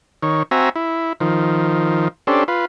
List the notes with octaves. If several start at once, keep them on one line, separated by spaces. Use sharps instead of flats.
D#3 C#5
C4 F#4 E5 G#5 A#5
E4
D#3 F3
C#4 D4 G4 A4 C5
F4 B4